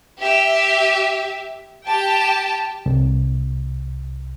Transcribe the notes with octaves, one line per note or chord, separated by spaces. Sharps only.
G4 E5
G4 G5 A5
C2